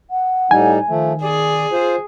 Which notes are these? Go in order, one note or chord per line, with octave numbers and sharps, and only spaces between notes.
F#5
A2 G3 D#4 G#5
D#3 F3 A3
G#4 D5
F4 C5